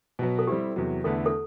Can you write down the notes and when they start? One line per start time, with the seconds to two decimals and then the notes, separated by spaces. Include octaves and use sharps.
0.19 B2 F#3 B3
0.39 A4
0.47 G3 C4 E4 G4
0.76 E2 C3 F#3
1.04 E2 D3 A3 E4 A4 B4
1.26 A4